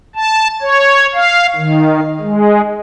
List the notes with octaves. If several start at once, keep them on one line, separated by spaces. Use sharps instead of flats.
A5
C#5
F5
D#3
G#3